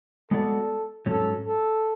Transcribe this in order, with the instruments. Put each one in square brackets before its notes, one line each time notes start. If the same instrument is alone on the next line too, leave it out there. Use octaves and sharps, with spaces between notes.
[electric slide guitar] G#3 B3 F#4 B4 D5 [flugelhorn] A4
[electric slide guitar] G#2 F#3 C#4 [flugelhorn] A4
[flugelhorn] A4